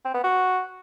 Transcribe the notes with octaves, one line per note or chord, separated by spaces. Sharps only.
C4
B3
F#4